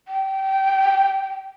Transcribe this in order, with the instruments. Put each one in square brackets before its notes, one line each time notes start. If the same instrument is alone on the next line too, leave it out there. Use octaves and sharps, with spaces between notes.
[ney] G5